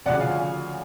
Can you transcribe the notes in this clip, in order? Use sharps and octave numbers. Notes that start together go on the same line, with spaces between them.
D2 C#3 F3 D5 F#5
F5 G#5